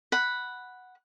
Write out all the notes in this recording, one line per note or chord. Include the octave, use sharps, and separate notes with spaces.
F#5 B5